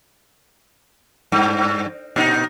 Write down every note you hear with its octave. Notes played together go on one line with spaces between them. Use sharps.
G2
A#2 D#4